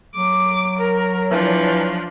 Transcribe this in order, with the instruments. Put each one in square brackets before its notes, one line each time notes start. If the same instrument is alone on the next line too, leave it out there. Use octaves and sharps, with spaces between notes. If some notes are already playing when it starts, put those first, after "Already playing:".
[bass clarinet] F#3 [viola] D6
[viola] A#4
[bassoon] E3 [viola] F3 D4